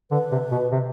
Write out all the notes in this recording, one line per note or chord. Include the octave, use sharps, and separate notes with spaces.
D3 B4
C3
B2
C3